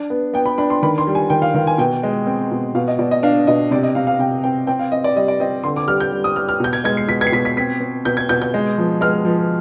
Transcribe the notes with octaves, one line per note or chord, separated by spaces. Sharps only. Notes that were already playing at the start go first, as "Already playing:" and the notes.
Already playing: D4
B3
B3 G5
B5
D4 B5
C6
D#3 B5
C6
G3
G#5
D#3 G5
F5
D#3 F5
G#5
B2 G5
G#3
C4
B2
B2 F5
D#5
B2 D5
D#5
D4 F5
B2 D#5
C3 D5
D#5
C3 F5
F5
C3 G5
C4 G5
C4 G5
F5
C4 D#5
D5
G3 D#5
D5
C4 D#5
D3 C6
D6
G3 F6
G6
G3
D#6
G3 F6
F6
B2 G6
G#6
G#3 G#6
C7
B2 B6
G#6
C7
B2 B6
B6
C4 B6
C4
B2 G6
G#6
B2 G6
G6
G#3
F3
G#3 F6
F3